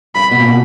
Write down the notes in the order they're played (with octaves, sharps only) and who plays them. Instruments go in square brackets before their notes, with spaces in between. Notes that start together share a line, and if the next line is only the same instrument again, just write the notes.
[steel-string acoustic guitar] G2 [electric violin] B5
[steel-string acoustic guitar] B2
A#2
B2